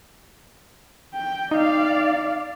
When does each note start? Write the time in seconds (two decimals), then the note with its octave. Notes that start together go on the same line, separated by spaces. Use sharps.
1.14 G5
1.51 D#4 D5 F5